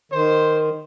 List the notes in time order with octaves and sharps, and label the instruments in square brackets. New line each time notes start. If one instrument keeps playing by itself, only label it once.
[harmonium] D#3 [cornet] C5